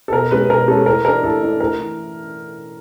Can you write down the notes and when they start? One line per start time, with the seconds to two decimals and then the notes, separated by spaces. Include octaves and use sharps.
0.08 A4
0.12 B2 A#4
0.31 G#3 C#4 B4
0.50 B2 A#4
0.68 G#3 C#4 A4
0.86 A2 A#4
1.05 E3 A3 D4 A#4
1.23 A2 A4
1.42 E3 A3 D4
1.60 A2 A#4
1.79 E3